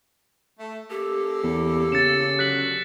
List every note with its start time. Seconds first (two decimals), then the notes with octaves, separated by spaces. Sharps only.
0.60 A3
0.90 A#3 C#4 G4 A4
1.43 E2
1.92 C#3 A6 C#7 E7
2.39 D3 F#3 F#6 B6 F#7